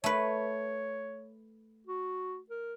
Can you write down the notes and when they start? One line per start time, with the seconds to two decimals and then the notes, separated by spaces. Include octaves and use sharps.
0.04 A3 B4 C#5
1.87 F#4
2.50 A#4